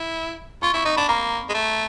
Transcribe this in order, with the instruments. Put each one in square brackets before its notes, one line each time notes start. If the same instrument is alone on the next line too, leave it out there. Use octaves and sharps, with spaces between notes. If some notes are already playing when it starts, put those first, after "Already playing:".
Already playing: [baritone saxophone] E4
[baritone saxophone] F4 [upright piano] C#6
[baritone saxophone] E4 [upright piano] C#6
[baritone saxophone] D#4 [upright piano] C#6
[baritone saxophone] D4 [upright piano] B5
[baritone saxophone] A#3 [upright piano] A#5
[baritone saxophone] G#3
A3